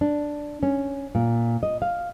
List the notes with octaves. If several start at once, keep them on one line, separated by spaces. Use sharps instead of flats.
D4
C#4
A#2
D#5
F5